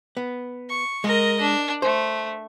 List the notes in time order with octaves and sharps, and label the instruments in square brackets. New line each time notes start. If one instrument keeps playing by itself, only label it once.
[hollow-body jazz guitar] B3
[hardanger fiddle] C#6
[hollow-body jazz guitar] G#3 [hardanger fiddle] A#4 D#5
[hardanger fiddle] D4
[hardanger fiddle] A3 [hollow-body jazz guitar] C5